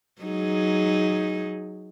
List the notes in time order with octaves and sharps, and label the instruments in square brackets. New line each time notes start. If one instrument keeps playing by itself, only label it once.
[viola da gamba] F#3 D#4 G#4